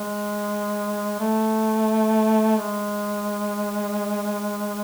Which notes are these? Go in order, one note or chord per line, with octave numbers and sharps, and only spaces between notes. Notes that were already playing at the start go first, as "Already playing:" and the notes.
Already playing: G#3
A3
G#3